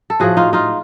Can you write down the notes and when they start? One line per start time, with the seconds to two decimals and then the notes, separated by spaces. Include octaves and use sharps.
0.10 A4
0.20 A2 F3 F#4 G#4
0.37 D#4 F4
0.53 D#4 F4